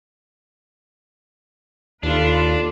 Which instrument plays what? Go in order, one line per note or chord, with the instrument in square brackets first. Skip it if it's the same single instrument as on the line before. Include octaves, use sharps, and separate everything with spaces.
[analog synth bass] D#2 [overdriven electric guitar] D4 [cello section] F4 A4 B4